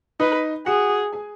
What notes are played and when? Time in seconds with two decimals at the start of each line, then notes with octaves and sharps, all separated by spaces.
0.20 D#4 B4 D#5
0.66 F#4 G#4 F#5
1.13 G#4 G#5